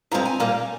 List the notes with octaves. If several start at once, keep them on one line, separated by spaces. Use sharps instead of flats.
G2 F3 G#3 C4 A#5
G#5
A#2 G3 A#3